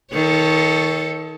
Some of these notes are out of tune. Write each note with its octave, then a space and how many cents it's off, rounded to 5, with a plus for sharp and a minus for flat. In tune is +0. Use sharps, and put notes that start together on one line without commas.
D#3 +30 A4 +0 C#5 +0